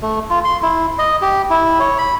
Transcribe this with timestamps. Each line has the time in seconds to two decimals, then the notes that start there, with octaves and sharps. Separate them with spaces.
0.02 A3
0.30 F4
0.44 C6
0.63 E4
0.98 D#5
1.22 G4
1.50 E4
1.80 C#5
1.98 B5